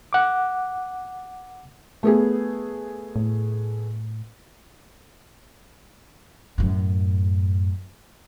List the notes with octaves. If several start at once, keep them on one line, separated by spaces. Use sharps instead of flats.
F#5 D6
A3 B3 G#4
A2
F#2 A2